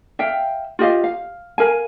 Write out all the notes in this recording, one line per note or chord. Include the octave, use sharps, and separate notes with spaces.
E5 F5 G5
F4 G4 D#5 F5
F5
A#4 F5 G#5